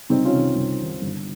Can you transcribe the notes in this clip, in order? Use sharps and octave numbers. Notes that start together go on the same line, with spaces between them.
C2 C4 D#4
C#4 F4
C3 D#3
C2
C3 D#3
G1